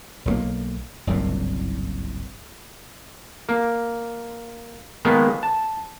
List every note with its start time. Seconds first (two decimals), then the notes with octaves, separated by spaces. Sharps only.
0.25 B1 G3 A#3
1.07 F#1 C2 G2 A#2
3.49 A#3
5.05 D#3 G#3 A#3 B3
5.43 A5